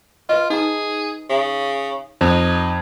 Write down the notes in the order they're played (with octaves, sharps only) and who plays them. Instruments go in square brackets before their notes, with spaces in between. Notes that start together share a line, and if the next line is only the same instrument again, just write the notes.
[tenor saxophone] F4 [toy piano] B4 D#5
[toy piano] D#4 A#5 [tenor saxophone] G#4
[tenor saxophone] C#3
[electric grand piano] F2 [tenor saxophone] D#4 [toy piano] C5